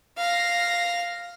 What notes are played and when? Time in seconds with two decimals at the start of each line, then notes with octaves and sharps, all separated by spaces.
0.18 F5 A#6